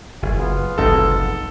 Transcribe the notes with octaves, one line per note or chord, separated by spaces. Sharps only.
F#1 G#5
B3 F4
F#1 C2 F2 A2 D#4 A4